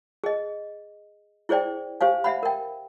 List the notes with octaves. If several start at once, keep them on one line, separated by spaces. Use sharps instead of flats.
G#4 D#5
E4 G#4 C5 D5 G5
G4 C5 F5 G#5
E5 F#5 B5
A#4 G5